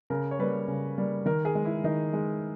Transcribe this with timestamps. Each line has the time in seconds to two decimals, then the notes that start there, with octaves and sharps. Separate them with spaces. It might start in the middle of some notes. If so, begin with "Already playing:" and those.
0.10 C#3 A#4
0.31 C#5
0.39 G3 A#3 B4
0.68 C#3
0.98 G3 A#3
1.26 D#3 A#4
1.45 G#4
1.55 G#3
1.65 E4
1.84 D#3 D#4
2.13 G#3